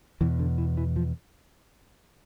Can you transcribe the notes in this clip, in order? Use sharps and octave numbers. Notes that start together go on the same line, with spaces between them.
E2 B2 E3
D3
E3
E3
F3